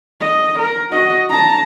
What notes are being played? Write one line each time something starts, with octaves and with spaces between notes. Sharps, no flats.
D#5
A#4
F#4 D#5
A5 A#5